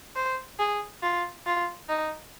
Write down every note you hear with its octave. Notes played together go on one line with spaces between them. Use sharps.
C5
G#4
F4
F4
D#4